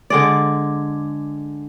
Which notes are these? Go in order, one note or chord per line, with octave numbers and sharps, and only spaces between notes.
D3 G#3 D5